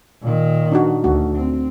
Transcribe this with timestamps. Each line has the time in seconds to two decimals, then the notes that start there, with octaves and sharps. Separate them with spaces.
0.22 A#2 D#3
0.72 D4 D#4 F#4
1.04 D2 A3 F#4
1.36 C4